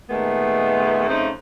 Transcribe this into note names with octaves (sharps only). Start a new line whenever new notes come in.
A#2 D#3 G#3 A3 B3
F2 C#3 A3 D#4 C5